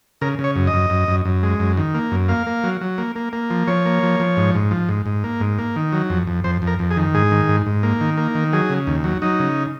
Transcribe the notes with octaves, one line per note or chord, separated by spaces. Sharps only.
C#3 A#4
C#3
C#5
F#2
D#5
F#2
F#2
F#2
F#2
G#3
F#2
D#3
A#3
F#2
A#3 F5
A#3
F#3
F#3
A#3
A#3
A#3
F3
F3 C#5
A#3
F3
F3
G#2
G#2
F3
G#2
G#2
A#3
G#2
A#3
D#3
F#3
F2
F2
F2 C5
F2
A#4
F2
G#4
D#3
G#2 G#4
D#3
G#2
G#2
A#3
D#3
A#3
D#3
F#3 G#4
C#3
D#2
F#3
F#3 D#4
C#3